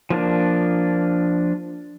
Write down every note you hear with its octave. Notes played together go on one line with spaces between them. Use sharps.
F3 A#3 D4